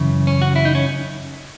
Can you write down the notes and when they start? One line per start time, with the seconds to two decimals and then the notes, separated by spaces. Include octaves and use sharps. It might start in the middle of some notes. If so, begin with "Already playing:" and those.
Already playing: F#2 C#3 E3
0.27 C#4
0.42 F#4
0.56 E4
0.65 D#4
0.75 C#4